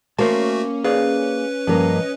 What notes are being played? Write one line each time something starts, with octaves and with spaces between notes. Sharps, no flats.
A3 A#3 C#4 F#4 C5 A5
G#4 B4 D5 F5
G2 F3 A#3 C#4 D#5